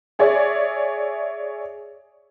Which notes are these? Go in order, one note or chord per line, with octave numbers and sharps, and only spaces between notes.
G#4 C#5 D5 E5